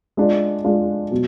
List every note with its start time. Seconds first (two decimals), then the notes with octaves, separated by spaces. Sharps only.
0.17 G#3 D4 F4
0.64 G#3 D4 F4
1.11 B2 F#3